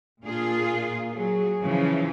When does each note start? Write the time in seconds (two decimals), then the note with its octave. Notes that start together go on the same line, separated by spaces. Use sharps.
0.24 A#2 D4 F4 G#4
0.74 A#3
1.17 F#3 G#4
1.63 C#3 E3 F3